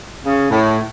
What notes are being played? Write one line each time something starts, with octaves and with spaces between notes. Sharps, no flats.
C#3
A2